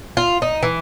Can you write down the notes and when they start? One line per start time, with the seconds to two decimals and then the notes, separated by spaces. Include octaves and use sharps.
0.17 F4
0.42 D#4
0.63 E3